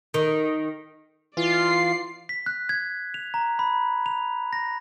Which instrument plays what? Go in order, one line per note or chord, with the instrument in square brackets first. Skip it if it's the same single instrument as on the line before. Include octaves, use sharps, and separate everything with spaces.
[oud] D#3
[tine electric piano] E3 [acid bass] F4 [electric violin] D5 C7
[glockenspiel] B6
F#6
G#6
F7
A#5
B5
F7
A#6